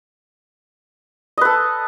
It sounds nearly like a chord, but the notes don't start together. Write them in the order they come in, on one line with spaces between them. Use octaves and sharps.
D#5 B4 A4